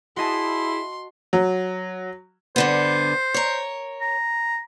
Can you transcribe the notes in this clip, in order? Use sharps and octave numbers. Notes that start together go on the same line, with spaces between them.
E4 F#4 G#4 D#5 A5 C6
F#3
G2 D3 B3 C5
A#4 C#5
A#5